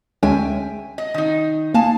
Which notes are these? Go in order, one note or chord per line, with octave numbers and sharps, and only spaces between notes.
D2 G#3 C#4 E5 G5 G#5
D#5
D#3 D#4
A#3 F5 G#5 A5